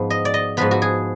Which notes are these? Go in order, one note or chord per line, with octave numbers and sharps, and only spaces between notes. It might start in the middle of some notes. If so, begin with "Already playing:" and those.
Already playing: G#2 F3 B3
D#5
D5
D#5
G#2 F3 B3 B4
F#4
G#4